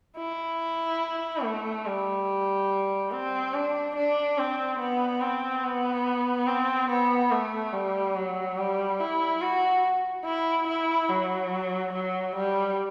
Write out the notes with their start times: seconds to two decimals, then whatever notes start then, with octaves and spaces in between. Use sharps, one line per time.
0.17 E4
1.43 A3
1.86 G3
3.11 C4
3.54 D4
3.96 D4
4.38 C4
4.79 B3
5.22 C4
5.64 B3
6.47 C4
6.89 B3
7.31 A3
7.73 G3
8.15 F#3
8.58 G3
9.00 E4
9.41 F#4
10.25 E4
10.67 E4
11.09 F#3
11.93 F#3
12.36 G3